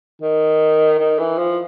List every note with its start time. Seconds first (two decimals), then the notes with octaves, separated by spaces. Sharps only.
0.22 D#3
0.99 D#3
1.19 E3
1.38 F3